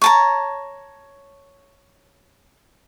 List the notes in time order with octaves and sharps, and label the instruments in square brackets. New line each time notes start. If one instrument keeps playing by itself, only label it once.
[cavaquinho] C#5 A5 A#5